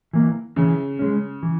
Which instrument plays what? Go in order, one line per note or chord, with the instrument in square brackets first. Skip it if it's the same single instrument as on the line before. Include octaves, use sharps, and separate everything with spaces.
[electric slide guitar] E3 A#3
[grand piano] C#3 [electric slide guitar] E3
[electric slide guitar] G#3 C#4
E3